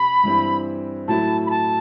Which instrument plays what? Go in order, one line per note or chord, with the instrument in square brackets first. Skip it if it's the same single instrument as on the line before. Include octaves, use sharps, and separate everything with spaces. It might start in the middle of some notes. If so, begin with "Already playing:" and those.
Already playing: [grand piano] C3 [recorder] B5
[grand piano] G2 E3 G3 C4 E4
[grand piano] A2 F#3 A3 E4 [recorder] A5
[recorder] B5
A5